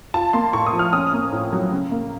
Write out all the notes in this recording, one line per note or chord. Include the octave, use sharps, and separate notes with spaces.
F4 A5
A#3 C6
A2 C#6
D#6
F3
F6
C#4 D#6
A#3
A2
F#3
C#3
A#3